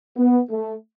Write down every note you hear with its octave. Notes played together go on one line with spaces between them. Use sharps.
B3
A3